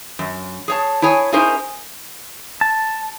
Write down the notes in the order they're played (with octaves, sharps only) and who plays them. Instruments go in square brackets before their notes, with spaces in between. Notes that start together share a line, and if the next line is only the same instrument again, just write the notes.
[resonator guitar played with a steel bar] F#2
G#4 C#5 A5
E4 G#4 C#5 G#5
C#4 D#4 E4 G#4 A#4 C5
[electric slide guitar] A5